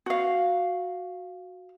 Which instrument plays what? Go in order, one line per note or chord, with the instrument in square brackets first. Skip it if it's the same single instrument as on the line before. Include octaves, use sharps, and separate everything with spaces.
[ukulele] F#4 F5